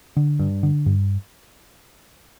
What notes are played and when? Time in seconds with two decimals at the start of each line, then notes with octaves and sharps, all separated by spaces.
0.16 D3
0.39 G2
0.63 D3
0.86 G2